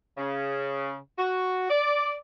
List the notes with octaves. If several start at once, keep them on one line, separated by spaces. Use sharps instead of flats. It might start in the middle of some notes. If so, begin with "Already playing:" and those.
C#3
F#4
D5